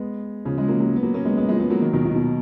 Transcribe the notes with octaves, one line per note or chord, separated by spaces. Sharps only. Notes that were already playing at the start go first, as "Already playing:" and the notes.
Already playing: G#3 B3
C#3 F3
F3 G#3
F#3 A#3
F#3 A#3
B3
F#3 A#3
A#3 C#4
G#3 B3
G#3 B3
F3 G#3
G#3 B3
F#3 A#3
D#3 F#3
B2 D#3
B2
B2